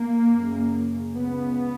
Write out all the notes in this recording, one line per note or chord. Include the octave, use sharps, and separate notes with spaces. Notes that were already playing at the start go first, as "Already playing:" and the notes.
Already playing: A#3
F#2 C#3
C#2 C#3 B3